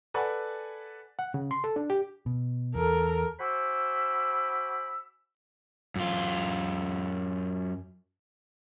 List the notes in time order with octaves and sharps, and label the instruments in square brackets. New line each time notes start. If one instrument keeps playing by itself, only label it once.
[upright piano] A4 B4 D5 F#5 G#5
[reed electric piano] F#5
C#3
C6
A4
D4
G4
[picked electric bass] B2
[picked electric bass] E2 [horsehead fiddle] A4 A#4
[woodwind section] F#4 C5 G#5 B5 D6 E6
[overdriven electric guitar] F#2 F4